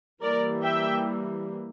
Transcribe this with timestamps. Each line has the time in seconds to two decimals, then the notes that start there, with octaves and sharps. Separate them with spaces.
0.22 E3 G3 A#3 A#4 D5
0.62 E5 G5